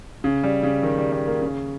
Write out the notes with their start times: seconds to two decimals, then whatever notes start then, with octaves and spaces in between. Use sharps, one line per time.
0.24 C#3
0.43 G3
0.63 C#3
0.83 D#3
0.98 G3
1.12 G3
1.27 A#3
1.42 C#3